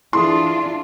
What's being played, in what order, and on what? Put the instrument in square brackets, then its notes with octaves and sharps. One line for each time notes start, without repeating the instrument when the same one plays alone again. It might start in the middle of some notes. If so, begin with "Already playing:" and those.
[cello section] E3 D4 F4 [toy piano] E4 G#4 A4 [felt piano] C6